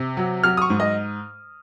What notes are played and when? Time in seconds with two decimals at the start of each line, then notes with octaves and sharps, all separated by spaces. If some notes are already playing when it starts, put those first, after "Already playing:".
Already playing: C3
0.17 F#3
0.43 F#3 F6
0.57 D#6
0.62 C#6
0.70 G#2
0.80 D#5